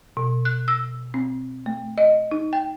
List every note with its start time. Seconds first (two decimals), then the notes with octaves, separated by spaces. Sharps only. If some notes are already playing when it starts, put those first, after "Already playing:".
0.17 B2
0.45 F#6
0.68 E6
1.14 C4
1.66 A3
1.98 D#5
2.31 D#4
2.53 G5